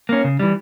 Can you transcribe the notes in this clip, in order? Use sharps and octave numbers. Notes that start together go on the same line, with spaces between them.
A#3 C#4
C#3
E3 G3